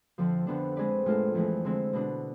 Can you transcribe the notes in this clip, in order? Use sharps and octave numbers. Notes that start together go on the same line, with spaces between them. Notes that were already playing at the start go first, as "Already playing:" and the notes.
F2 D3 F3
F2 D3 F3 B3 D4
G#3 C4 G#4 B4 D5
A2 G#3 D4 F4 A4
F2 E3 G#3
D3 G#3 C4 E4
B2 B3 D4